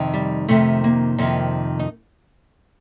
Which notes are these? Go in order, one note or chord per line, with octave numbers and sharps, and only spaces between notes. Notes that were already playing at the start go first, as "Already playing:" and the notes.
Already playing: F2 C3 D#3
G3
F2 C3 D#3 A3
A#3
F2 C3 D#3
D#4